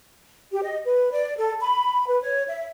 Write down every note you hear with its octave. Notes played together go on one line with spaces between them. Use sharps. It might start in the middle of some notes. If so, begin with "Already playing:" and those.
G4
D#5
B4
D5
A4
B5
B4
C#5
E5